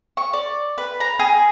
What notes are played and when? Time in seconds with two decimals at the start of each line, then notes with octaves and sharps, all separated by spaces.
0.17 C#6
0.33 D5
0.78 B4
1.00 A#5
1.19 G#4